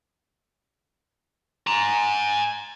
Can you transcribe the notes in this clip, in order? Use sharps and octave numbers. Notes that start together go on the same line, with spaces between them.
G#5 A#5